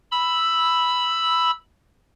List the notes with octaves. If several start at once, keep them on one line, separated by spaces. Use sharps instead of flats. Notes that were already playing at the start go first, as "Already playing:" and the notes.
B5 E6